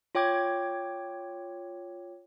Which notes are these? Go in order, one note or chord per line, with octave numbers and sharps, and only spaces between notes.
F4 C#5 G5 D6 G#6